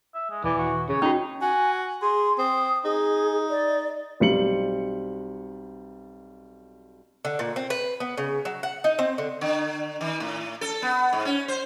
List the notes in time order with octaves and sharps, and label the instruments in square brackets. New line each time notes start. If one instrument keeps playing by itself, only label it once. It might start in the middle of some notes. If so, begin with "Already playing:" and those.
[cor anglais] E5
G#3
[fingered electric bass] D#1 [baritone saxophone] E3 [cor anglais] D5
[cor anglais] F#4
[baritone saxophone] C#3 [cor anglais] C#5
[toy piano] C#4 F#4 [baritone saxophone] D#4
[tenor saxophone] F#4 [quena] G#5
[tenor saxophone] G#4 [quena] C6
[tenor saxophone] C4 [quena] D#6
[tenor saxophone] D#4 [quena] G#4
[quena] D5
[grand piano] B1 G3 C4 C#7 F#7
[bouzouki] D3
A#2
C4
B4
B3
C#3
F#3
F#5
D#4
C4
D3
[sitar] D3
D#3
A2
A4
B3
G#2
C#4
C5